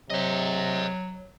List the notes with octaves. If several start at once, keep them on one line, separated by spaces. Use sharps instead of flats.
C3 F#3 C5 D#5